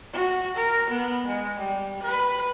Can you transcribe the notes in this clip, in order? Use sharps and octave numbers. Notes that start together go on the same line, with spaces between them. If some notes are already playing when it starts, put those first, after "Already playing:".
F#4
A#4
B3
G#3
G3
B4